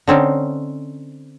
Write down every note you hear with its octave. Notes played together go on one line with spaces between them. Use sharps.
D3 C4 C#4 D#4